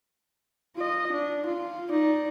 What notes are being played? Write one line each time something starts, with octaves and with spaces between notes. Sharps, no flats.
F4 D#5
D4
F4
D#4 D5